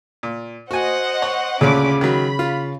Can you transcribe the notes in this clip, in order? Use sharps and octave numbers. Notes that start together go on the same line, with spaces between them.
A#2
F#4 C5 D#5 F#5 G#5
C#5
D2 A#2 C#3 C#4 B5 D6
D#3 F#3 B5
F4